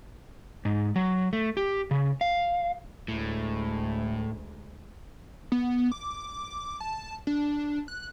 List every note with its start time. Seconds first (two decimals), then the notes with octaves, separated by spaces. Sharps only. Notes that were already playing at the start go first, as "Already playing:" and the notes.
0.65 G#2
0.96 F#3
1.33 A3
1.57 G4
1.91 C#3
2.21 F5
3.08 D2 A2 G#3
5.52 B3
5.92 D6
6.80 A5
7.27 D4
7.88 F#6